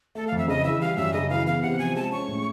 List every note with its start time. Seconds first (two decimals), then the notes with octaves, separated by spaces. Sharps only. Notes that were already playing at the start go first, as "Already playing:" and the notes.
0.15 A3 A4
0.27 F2 F5
0.38 E5
0.48 C#3 D#5
0.65 E3 E5
0.81 G3 F5
0.97 F#2 E5
1.13 C#3 D#5
1.30 E3 F5
1.46 B3 F5
1.63 C3 F#5
1.79 F3 G#5
1.95 G#3 A5
2.12 C#4 C#6
2.28 A2